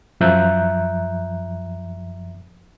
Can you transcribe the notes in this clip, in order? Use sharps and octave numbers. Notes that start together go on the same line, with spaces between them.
F#2 F3 E5 A#5 F#6 G6